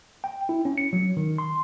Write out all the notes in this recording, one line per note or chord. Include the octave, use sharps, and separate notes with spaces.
G5
E4
C#4
C#7
F#3
D#3
C6